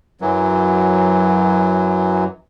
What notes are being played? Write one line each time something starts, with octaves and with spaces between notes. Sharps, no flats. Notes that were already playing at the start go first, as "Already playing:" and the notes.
F#2 E3 F#3